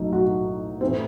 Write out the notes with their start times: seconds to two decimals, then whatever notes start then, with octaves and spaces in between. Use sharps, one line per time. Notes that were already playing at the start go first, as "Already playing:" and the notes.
Already playing: B1 A2 F#3 A3 D#4
0.13 F#4
0.81 A2 E3 A3 C4